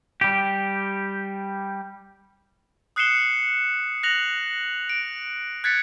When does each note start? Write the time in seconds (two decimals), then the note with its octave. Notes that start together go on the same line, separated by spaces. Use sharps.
0.21 G3 G4
2.96 D#6 F#6 C7 C#7 E7 G7
4.03 F#6 A#6 F7 F#7
4.89 D7
5.64 F#6 G#6 A6 B6 C#7